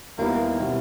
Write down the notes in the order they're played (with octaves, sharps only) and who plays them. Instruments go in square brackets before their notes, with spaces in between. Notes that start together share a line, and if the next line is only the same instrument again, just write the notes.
[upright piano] D#2 D#3 G3 B3 E4 [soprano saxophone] A#3
[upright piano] B2 G3 C4 E4